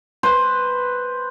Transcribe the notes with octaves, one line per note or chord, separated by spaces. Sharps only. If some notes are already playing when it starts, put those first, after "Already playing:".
B4 C5